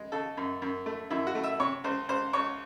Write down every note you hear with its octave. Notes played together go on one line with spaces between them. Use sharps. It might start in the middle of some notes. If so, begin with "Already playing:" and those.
Already playing: G#3
C#3 A4
F#2
F#2
A3
F#2 E4
F#4
A3
E5
C3 C#5
C#2 C5
C#2 C5
C#2 C#5